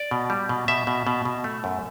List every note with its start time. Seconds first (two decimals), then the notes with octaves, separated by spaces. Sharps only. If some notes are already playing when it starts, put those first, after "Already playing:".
Already playing: D5
0.11 B2
0.30 G3
0.49 B2
0.68 B2 E5
0.87 B2
1.07 B2
1.25 B2
1.44 A3
1.64 F#2